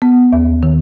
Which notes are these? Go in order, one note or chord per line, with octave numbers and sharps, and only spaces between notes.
B3
D#2
D#3